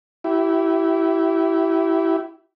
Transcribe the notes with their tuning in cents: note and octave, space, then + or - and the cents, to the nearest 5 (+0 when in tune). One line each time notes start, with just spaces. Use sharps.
E4 +0 G4 -35